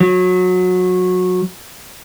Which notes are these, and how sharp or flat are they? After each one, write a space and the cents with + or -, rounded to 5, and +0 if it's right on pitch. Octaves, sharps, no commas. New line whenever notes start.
F#3 -20